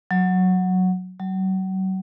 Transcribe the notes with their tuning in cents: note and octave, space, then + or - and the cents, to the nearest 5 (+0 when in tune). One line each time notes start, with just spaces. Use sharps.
F#3 -5
F#3 +35